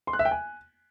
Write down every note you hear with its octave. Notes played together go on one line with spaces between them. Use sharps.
C6
F#6
E5
G5
G#5